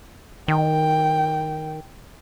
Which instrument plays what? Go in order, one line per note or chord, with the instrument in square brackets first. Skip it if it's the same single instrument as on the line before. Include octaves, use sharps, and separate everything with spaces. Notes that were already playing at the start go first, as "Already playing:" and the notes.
[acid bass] D#3 [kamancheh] G5